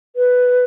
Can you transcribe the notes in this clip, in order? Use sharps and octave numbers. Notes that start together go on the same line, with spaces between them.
B4